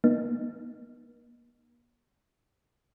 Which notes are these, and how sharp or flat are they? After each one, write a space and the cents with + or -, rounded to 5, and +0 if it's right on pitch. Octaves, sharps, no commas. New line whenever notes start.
A#3 +45 D#4 -25